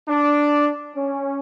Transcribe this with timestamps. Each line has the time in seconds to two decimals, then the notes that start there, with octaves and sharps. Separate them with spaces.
0.09 D4
0.95 C#4